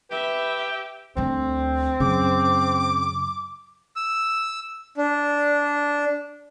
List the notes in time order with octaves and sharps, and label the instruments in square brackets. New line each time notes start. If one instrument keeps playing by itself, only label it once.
[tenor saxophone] G4 [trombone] B4 [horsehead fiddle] E5
[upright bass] D2 G3 [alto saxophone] C4
[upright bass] F#2 [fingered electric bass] C#3 [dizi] D6
[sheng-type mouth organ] E6
D4